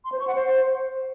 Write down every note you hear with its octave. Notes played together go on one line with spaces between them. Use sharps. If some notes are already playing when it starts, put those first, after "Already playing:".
C6
C5
C#6
F#5
C5